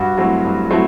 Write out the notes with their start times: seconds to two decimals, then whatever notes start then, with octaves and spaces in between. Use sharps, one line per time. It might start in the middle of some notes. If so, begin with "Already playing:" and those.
Already playing: G2 F#4
0.18 F#3 A3 C4 E4
0.44 G2
0.71 F#3 A3 C4 E4